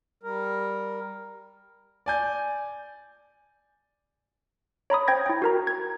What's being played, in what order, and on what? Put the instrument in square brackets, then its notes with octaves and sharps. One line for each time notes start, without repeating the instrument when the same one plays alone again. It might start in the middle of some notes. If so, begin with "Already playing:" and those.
[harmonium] G3 A#4
[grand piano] D5 G#5 G6
[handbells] C#5 A#5 B5 D#6
C5 G5 G#6 A#6
E4 G5
F#4 A#4 A#5
G#6